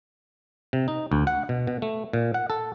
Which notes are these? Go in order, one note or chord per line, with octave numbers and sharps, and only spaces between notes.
C3
D#4
D2
F#5
B2
B2
A3
A#2
F#5
A4